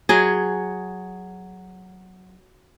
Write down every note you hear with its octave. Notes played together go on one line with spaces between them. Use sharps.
F#3 G#4